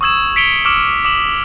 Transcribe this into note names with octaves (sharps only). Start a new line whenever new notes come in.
C#6 D#6 E6 G#6 E7
B6 C#7 D7 F7 G7
C#6 D6 E6 F6 D7 E7
D6 D#6 E7 F#7